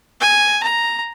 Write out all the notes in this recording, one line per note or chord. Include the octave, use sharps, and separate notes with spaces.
G#5
A#5